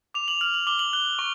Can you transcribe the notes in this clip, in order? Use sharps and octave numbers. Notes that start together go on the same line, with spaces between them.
D6 F7
F#7
F6 F#7
F#7
D6 G7
F#7
F#6 G7
C#6